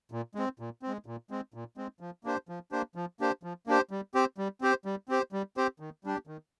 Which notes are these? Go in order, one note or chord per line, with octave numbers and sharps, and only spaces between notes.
A#2
G#3 C4
A#2
G#3 C4
A#2
G#3 C4
A#2
G#3 C4
F3
A#3 D4 G4 C5
F3
A#3 D4 G4 C5
F3
A#3 D4 G4 C5
F3
A#3 D4 G4 C5
G3
C4 G4 C5
G3
C4 G4 C5
G3
C4 G4 C5
G3
C4 G4 C5
D#3
G3 D4 G4
D#3